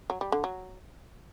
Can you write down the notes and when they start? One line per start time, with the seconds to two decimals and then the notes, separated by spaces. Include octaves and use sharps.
0.10 F#3
0.21 G3
0.32 D3
0.44 F#3